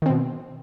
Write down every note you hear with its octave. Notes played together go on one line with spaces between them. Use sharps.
B2 D#3 C4